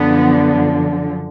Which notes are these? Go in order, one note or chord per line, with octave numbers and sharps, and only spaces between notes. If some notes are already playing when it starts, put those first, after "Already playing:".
Already playing: F#2 D3 F3 B3